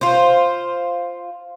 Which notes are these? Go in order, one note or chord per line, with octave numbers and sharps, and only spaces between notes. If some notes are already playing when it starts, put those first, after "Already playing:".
F4 C5